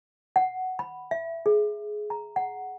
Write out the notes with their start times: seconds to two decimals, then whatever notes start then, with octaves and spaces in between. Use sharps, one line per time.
0.36 F#5
0.79 B5
1.11 E5
1.46 G#4
2.10 A#5
2.36 F#5